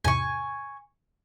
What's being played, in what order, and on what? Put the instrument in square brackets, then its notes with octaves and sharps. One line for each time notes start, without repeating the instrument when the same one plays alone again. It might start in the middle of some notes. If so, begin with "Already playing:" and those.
[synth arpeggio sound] E2 G#2 C3 [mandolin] G#5 C#6